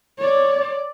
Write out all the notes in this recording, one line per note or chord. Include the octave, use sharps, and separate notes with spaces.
C#5 D5